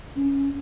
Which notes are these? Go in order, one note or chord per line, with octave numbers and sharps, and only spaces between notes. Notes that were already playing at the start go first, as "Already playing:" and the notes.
C#4